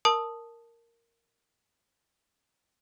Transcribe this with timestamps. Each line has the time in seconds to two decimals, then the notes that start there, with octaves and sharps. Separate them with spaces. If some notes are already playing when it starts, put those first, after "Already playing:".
0.05 A#4 A5 D#6